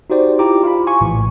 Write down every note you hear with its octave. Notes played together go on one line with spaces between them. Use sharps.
D#4 F#4 G4 C5 D5
E4 F4 G4 A#5 D6
F4 F5 B5
G#5 C#6
A#1 A2 E3